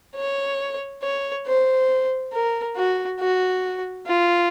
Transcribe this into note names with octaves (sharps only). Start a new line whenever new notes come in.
C#5
C#5
C5
A#4
F#4
F#4
F4